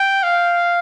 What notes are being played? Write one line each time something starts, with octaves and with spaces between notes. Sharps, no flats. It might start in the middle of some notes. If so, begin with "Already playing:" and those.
Already playing: G5
F5